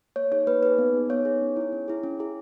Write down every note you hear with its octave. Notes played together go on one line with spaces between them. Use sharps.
A#3 C#5
D#4 G#4 C#5
A#3 B4
D#4 G#4 B4
B3
D#4 G#4
B3 C#5
D#4 G#4
C#4
E4 G#4
C#4
E4 G#4
C#4
E4 G#4